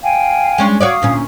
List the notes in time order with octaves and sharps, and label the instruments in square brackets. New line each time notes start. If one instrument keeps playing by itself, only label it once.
[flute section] F5 G5 G#5
[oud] G#3 C#4 D4
[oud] F#4 C#5 D5 [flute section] F5 D#6
[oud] D2 A#2 C#4